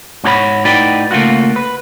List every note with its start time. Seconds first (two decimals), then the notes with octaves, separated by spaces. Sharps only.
0.24 G#2 C#4 F#4 G4 C#5 B5
0.65 A2 D#4 F#4 B4 D5 G5
1.11 C#3 A3 A#3 F4 F#4
1.56 B4